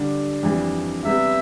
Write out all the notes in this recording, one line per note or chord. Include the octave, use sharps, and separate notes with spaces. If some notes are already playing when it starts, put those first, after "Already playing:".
Already playing: D3 G3 D4 G4
F2 E3 G3 D4
C3 G3 B3 E5